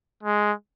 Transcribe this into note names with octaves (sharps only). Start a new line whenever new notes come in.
G#3